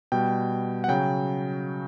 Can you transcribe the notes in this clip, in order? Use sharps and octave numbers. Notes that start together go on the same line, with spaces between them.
B2 G3 G5
F#5
C#3 F#3 G5